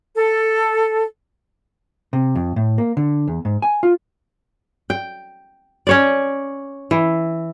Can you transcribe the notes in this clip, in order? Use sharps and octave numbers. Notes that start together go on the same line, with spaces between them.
A4
C3
F2
A2
A#3
D3
E2
G#2
G#5
F4
G5
C#4 C#5 D5
E3